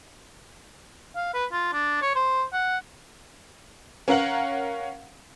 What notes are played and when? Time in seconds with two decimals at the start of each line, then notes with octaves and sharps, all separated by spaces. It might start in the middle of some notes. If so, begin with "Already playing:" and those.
1.16 F5
1.34 B4
1.52 F4
1.73 D4
2.02 C#5
2.15 C5
2.53 F#5
4.08 C#4 A#4 F5 F#5 F#7